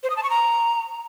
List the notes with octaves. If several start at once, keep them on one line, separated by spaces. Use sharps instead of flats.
C5
D#6
A5
C#6
A#5